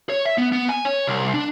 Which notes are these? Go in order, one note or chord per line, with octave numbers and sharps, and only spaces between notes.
C#5
E5
B3
B3
G#5
C#5
C2
D4